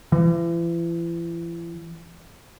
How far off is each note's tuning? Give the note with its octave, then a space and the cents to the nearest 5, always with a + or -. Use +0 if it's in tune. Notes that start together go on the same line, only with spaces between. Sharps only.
E3 +40